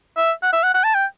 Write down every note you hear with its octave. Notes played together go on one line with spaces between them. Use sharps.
E5
F#5
E5
F#5
F#5
A5
G5